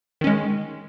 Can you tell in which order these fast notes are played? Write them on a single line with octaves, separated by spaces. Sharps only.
D#3 C#4 G#3